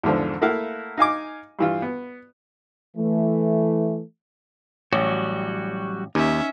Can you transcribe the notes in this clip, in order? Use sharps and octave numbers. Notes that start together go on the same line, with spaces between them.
E2 G#2 D3 F3
A3 A#3 E4 A#4 F5 F#5
D#4 F5 G#5 D6
G2 E3 F4
B3
E3 A3
A1 F#3 G3 F#4 C#5
D#2 C#4 D#4 E5